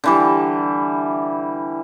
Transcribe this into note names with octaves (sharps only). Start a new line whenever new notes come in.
D3 E3 G3